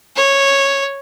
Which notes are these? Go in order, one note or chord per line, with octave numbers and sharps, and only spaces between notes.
C#5